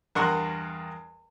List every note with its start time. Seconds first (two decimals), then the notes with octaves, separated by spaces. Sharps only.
0.15 E2 G2 A#4 F#5 C6 C#6